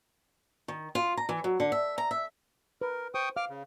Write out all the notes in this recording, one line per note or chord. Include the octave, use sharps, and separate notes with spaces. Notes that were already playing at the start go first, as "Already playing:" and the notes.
D#3
F4
A#5
E3
F#3
D3
E5
A#5
E5
A#4 B4
C5 G5 C#6 D#6
F5 D6 F6
C#3